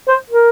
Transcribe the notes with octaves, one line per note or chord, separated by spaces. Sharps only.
C5
A#4